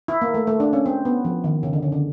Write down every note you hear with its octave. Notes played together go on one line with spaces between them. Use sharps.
E4
A#3
A3
A3
D4
C#4
C4
B3
F3
D#3
C#3
D3
C#3
D3